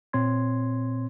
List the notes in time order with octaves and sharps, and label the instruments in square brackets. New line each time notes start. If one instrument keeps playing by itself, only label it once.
[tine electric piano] A#2 C4 C#5 C6 G#6